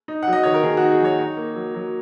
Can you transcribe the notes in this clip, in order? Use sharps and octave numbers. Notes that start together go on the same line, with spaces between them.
D#4
F#3 F#5
D#5
D#3 C#5
A#4
D#3 G#4
F#4
D#4
G#4
F#3 C#5
D#4
A#3
F#3
F#3